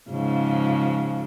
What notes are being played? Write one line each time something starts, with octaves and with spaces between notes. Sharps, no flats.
G#2 C#3 F3